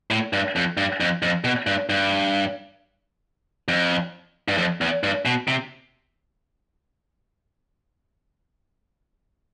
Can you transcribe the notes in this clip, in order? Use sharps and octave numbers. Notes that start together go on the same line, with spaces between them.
A2
G2
F2
G2
F2
F2
B2
G2
G2
F2
G2
F2
E2
G2
B2
C3